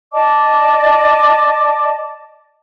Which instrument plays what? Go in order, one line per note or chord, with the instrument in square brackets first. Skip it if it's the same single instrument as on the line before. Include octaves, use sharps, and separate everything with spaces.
[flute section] D5 D#5 A5 D6